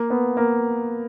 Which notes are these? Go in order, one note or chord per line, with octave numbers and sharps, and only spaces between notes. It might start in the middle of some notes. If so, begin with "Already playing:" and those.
Already playing: A#3
B3
A#3